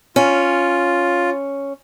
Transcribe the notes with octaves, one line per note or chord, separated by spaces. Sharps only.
C#4 F4